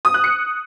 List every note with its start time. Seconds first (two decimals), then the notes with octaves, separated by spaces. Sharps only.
0.05 D#6
0.14 F#6
0.24 C#7